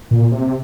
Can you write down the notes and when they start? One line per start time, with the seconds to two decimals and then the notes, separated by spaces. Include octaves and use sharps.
0.11 A#2
0.32 C3
0.47 C3